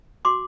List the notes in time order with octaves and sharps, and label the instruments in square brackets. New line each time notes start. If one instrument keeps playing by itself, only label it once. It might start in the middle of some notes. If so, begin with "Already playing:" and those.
[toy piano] F#4 C6 D6